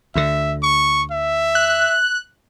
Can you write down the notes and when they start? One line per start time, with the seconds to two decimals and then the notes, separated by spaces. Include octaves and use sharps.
0.15 D2 D3 E5
0.63 C#6
1.12 E5
1.55 F#6